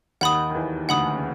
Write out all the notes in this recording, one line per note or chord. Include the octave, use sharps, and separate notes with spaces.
D#2 D#3 F#5 B5 D#6
D#3
E2 E3
D2 D3 F#5 B5 D#6
C#3